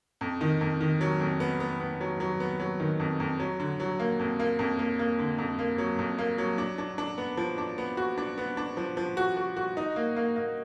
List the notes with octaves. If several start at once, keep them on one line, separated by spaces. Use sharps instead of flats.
F2
D#3
F2
D#3
F#3
F2
B3
B3
B3
F#3
F#3
B3
F#3
D#3
F2
F2
F#3
D3
F#3
A#3
F2
A#3
F2
A#3
A#3
D3
F2
A#3
F#3
F2
A#3
F#3
D4
D4
D4
B3
F3
D4
B3
F#4
D4
B3
D4
F3
F3
F#4
F#4
F#4
D#4
A#3
A#3
A#3